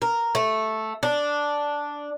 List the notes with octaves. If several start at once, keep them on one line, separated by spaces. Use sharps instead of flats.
A#4
A3
D4